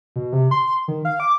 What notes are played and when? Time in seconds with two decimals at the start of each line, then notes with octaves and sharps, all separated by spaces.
0.16 B2
0.32 C3
0.51 C6
0.88 D#3
1.05 F5
1.20 D6